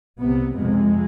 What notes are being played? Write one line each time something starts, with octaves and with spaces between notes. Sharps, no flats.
C2 C3 B3
F2 C3 G#3